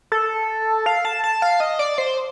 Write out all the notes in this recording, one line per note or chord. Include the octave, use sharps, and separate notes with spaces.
A4
F5
A5
A5
F5
D#5
D5
C5